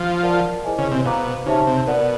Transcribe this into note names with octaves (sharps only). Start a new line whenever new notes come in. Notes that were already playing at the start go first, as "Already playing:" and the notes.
Already playing: F3
F4 A#4 D5 F#5 A5
E4 G#4 C5 D#5 G#5
C#3
C3
B2 C5 F5 A#5 D6
C#3 D#4 G4 C5 E5 A5
C3
B2 A#4 D5 F#5